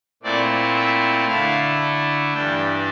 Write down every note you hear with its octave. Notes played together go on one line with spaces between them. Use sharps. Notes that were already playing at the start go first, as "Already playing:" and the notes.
A#2 A3 C4 E4 D5
E5
D3 A3 E4 F5
G2 E3 G3 D4 G5